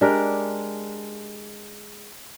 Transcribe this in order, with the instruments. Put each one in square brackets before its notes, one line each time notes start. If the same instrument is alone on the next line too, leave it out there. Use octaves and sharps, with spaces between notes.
[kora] G#3 D4 G4 A#4